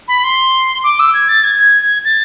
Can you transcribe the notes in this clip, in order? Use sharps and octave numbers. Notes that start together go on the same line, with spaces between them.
B5
C6
D6
E6
G#6
A6
G#6
A6